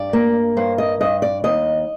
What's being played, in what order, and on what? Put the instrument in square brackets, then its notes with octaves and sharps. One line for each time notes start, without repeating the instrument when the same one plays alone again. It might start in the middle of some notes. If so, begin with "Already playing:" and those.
Already playing: [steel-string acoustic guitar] G2 D5
A#3
G2 C5
D#5
G2 D#5
D5
D#2 D#5